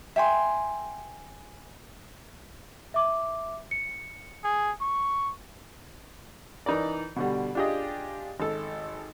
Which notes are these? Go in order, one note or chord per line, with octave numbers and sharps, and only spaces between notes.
E5 G5 G#5 C6
E5 D6
C#7
G#4
C#6
E3 D#4 A#4 D5
B2 D3 G3
D4 F4 G4 G#4 D#5
G#1 A4